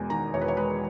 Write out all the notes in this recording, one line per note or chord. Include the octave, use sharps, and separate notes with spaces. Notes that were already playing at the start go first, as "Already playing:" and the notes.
Already playing: E1 E2 G#3 G#5
D#3 A#5
E1 C#5
B4
C#5
G#3 B4